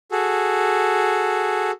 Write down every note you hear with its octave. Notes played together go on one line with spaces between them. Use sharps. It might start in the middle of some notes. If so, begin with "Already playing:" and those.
F#4 G#4 A4